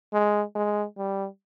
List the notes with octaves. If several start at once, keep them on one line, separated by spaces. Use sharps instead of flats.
G#3
G#3
G3